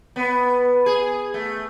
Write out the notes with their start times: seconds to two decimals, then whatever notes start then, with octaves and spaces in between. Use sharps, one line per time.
0.16 B3
0.86 G#4
1.34 A3